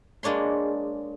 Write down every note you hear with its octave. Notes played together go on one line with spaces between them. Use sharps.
G#3 A#3 D4 C#5 C6